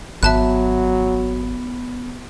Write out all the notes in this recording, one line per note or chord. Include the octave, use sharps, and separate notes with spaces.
G#1 F#3 B3 E5 A5 F#6